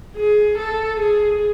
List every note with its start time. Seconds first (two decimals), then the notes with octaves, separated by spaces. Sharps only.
0.17 G#4
0.58 A4
1.00 G#4